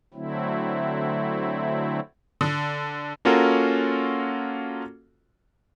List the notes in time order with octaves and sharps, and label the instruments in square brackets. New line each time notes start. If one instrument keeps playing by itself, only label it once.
[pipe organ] D3 F#3 A3 C4 E4
[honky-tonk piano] D3
[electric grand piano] A#3 C#4 F4 F#4 A4 A#4